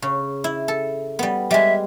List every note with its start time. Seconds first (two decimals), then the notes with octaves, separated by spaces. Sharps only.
0.02 C#3
0.44 E4
0.68 A4
1.19 G3 B3
1.51 G3 G#3 E5